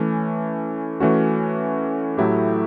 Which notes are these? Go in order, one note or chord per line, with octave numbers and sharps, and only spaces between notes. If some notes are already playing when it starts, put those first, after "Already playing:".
Already playing: E3 A3 C#4
E3 A3 C#4 F#4
A2 F#3 A3 E4 G4